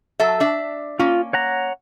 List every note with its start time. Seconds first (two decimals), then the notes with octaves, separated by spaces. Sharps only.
0.20 F#3 A4 E5
0.40 D4 E5
0.99 A#3 C#4 F4
1.33 C#5 F#5 A#5